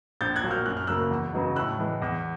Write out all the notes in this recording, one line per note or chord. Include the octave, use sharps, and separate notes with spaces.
A#1 G6 A6
F#6 G#6
A#2 F#3
F6 G6
F#2 F#6
F6
C#3 F#3 A#3 E6 F#6
E2
C#3 F#3 B3 D#4
A2 E6 F#6
E3 G#3
E2